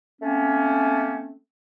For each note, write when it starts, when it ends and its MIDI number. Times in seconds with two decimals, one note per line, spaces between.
0.22 1.34 57
0.22 1.34 58
0.22 1.34 60
0.22 1.34 61